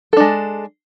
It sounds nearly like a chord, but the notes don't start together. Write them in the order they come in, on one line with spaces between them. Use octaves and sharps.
A4 D4 G#3